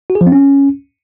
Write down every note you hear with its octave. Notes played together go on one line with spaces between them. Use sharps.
F#4
G#4
F3
C4
C#4